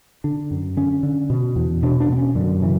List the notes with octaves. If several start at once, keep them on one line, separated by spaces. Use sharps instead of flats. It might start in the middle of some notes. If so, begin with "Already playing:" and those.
D3 D4
F#2
D3 C#4
D3
B2
E2
B2 D4
D4
B2 B3
C#4
F#2 D3
C#3 E3